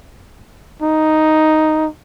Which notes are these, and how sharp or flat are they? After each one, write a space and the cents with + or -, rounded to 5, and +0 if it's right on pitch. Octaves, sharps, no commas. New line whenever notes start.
D#4 +0